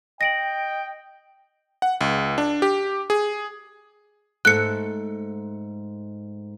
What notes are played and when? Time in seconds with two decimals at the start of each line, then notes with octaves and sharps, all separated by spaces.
0.21 D#5 G5 A#6 D7 F#7
1.82 F#5
2.01 C#2
2.38 D4
2.62 G4
3.10 G#4
4.45 G#2 A3 A4 F#6 C#7